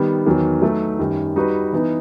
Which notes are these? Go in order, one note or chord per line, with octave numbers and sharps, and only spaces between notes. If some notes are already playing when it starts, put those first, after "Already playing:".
Already playing: D#3 G3 B3
E2 D#3 F#3
F#3 A3 D#4 F#4 A4
F#2 D#3 G3
G3 D#4 F#4 B4
E3 B3 D#4